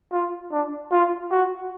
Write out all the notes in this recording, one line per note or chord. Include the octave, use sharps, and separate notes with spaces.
F4
D4
F4
F#4